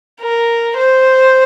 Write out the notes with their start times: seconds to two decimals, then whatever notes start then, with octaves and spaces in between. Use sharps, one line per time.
0.21 A#4
0.77 C5